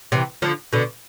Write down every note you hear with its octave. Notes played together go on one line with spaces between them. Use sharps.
C3 E3
D3 F3
B2 D3